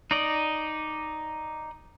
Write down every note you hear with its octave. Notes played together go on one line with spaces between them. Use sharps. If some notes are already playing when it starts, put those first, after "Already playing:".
D#4 D5 D#5